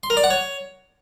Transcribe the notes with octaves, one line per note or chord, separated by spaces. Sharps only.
C6
A#4
D5
F#5
C#5